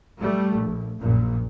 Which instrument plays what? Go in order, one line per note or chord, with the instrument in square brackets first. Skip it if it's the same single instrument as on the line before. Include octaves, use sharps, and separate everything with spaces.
[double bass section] G3 A3
A#1
A#1 F#2 A#2